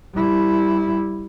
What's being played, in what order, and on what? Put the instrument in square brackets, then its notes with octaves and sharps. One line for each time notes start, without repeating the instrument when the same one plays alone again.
[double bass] G3 E4